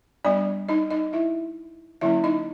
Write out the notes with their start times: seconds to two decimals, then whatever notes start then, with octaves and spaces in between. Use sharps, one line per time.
0.25 G3 B3 D4 D5
0.69 D#4 D#5
0.91 D#4 D#5
1.13 E4 E5
2.01 D3 F#3 A#3 C#4 E4 E5
2.24 D#4 D#5